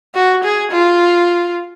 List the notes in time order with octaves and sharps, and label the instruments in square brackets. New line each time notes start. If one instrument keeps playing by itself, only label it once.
[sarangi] F#4
G#4
F4